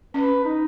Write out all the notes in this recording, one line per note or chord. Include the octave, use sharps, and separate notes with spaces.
C#4 B4
D#4